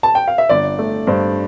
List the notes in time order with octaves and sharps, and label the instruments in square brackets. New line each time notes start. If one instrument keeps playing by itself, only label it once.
[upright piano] A5
G5
F5
E5
G1 D5
A3
G2 C5